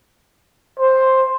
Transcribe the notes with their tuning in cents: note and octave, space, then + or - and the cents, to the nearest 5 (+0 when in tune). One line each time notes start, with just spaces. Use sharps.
C5 +5